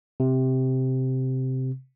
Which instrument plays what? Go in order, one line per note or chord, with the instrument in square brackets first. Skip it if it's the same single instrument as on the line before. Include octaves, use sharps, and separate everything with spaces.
[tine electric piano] C3